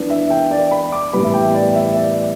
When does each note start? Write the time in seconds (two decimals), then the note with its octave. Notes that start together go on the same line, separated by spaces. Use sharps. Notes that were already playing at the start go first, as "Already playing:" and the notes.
Already playing: E3 B3 D4
0.10 E5
0.30 G5
0.51 D5
0.71 B5
0.92 D6
1.13 A2 E3 G3 B3 B5
1.24 E5
1.34 G5
1.54 D5
1.75 E5
1.96 D5